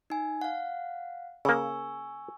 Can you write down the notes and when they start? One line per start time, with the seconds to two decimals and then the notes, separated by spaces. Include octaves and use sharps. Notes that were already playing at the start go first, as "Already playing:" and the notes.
0.10 D#4 G#5
0.41 F5 F#5
1.45 C#3 A#3 G#5 C#6 E6